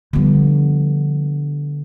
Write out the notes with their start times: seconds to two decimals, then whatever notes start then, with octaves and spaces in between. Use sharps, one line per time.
0.13 D3 F3 G3 B3